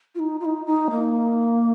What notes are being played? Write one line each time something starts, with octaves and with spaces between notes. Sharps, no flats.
F4
D#4
F4
D#4
D#4
A#3